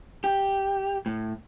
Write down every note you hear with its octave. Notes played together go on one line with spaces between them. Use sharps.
G4
A2